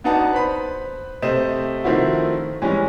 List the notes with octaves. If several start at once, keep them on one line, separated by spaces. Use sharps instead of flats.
B3 D4 D#4 F#4 F#5 A5
B4 C5 B5
C3 A3 C5 D#5 E7
D#3 F3 A3 C4 E4 F#4
E3 G3 G#3 C#4